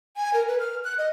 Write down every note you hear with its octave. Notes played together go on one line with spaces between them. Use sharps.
G#5
A#4
B4
F6
F#6
D#5